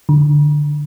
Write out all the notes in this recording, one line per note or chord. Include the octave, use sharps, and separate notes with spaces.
D3